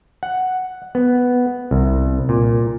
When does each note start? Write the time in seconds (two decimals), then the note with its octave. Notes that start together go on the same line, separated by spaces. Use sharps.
0.23 F#5
0.95 B3
1.71 C2
2.29 A#2